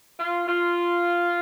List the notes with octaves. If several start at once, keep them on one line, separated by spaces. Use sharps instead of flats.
F4
F4